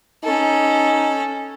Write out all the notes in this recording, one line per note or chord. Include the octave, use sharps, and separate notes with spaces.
C#4 D#4 A4